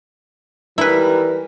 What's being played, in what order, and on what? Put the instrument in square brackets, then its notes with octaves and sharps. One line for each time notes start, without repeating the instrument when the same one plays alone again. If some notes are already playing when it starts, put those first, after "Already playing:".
[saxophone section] D#2 G3 [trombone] E3 [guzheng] E4 B4 [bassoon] A#4